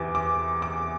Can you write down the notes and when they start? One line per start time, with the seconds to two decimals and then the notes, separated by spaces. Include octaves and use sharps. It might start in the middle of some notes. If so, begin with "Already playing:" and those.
Already playing: E2 C3 E3 D6
0.15 D6
0.62 D6